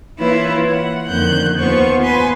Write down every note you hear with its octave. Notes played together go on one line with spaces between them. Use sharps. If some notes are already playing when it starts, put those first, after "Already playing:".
E3 A#3 E4 F4 B4 C#5
F#5
F2 D3 D#3 A#3 F#6 G6
D#2 B3 F4 C5 C#6
B4 G#5 C6